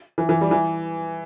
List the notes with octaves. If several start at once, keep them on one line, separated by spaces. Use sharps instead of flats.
E3
E3
G3
E3